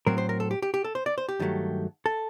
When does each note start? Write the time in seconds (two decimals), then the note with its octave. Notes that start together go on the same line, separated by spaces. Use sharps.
0.07 A2 F#3 C4 A#4
0.18 C5
0.29 A#4
0.40 A4
0.51 G4
0.62 G4
0.74 G4
0.84 A4
0.95 C5
1.06 D5
1.18 C5
1.29 G4
1.39 G2 D#3 F#3 A3
2.06 A4